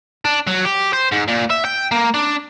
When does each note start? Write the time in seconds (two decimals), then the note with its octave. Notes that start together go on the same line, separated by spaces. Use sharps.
0.25 D4
0.47 F#3
0.65 G4
0.93 C5
1.12 G#2
1.28 A#2
1.50 E5
1.64 G5
1.91 A#3
2.14 D4